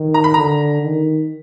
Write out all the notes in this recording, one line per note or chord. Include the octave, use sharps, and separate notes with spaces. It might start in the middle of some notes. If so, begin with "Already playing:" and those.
Already playing: D#3
A#5
B5
D3 A#5
D#3